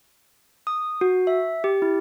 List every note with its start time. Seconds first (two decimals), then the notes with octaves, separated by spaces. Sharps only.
0.67 D#6
1.01 F#4
1.27 E5
1.64 G4
1.82 E4